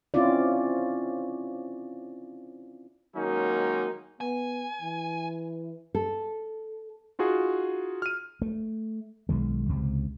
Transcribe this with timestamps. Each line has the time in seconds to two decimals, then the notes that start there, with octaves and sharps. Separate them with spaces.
0.14 C4 C#4 E4 F4 D5
3.16 D#3 F#3 G#3 A#3 C#4 D#4
4.21 B3 G#5
4.81 E3
5.95 A4
7.19 D#4 F4 F#4 G#4
8.02 F6 D#7
8.42 A3
9.29 B1 D#3 G#3
9.69 C#2 C3